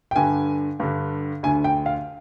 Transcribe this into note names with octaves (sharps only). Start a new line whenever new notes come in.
G5
G2 D3 G#5
G2 D3
D2 D3 G#5
G5
F5